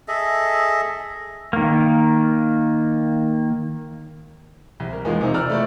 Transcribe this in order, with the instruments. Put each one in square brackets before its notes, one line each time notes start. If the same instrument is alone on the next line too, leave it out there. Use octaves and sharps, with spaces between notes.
[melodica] G#4 A4 D#5 E5
[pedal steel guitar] D#3 A#3
[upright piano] C2
A#4
E2 F3 G#3 A#3 D#4
C3 D#3 D#4 A#4
D5 A#5 E6 F6
A3 E4 D5